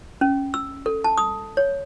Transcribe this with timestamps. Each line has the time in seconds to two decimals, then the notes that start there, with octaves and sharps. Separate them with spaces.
0.21 C#4
0.54 E6
0.86 A4
1.04 A5
1.18 D#6
1.57 C#5